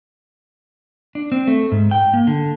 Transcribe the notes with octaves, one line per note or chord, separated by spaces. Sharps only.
D4
C4
A3
G#2
G5
A#3
D3